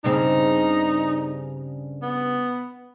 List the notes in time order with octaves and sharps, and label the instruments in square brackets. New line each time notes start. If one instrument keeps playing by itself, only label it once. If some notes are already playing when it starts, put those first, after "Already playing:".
[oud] G2 C#3 C4 [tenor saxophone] D#4
[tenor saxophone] B3